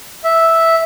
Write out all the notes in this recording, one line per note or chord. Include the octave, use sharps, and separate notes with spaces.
E5